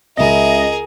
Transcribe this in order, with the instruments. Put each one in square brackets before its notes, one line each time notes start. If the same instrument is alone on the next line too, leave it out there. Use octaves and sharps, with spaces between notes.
[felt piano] C#2 C#3 C#4 [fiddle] G#4 A#4 [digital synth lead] D#5 [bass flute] E5